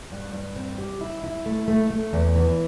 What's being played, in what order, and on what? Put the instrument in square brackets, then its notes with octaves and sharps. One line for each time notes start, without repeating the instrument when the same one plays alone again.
[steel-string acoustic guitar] G2
G2
C4
G4
E4
E4
A3
A3
A3
E2
E3